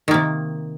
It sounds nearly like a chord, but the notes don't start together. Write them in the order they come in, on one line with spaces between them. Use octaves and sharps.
D#3 A#3 C3